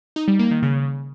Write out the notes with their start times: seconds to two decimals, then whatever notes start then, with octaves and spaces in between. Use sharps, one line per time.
0.16 D#4
0.28 G3
0.39 A#3
0.51 D#3
0.62 C#3